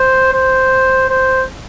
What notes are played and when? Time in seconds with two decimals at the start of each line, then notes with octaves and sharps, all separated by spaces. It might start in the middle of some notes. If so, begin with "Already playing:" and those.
Already playing: C5
0.33 C5
1.10 C5